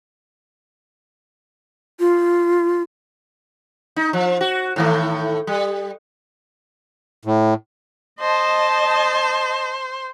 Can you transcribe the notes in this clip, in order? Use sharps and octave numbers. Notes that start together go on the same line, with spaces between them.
F4
D#4
F3
F#4
A2 D#3 A3
G3
A2
C5 D#5 A5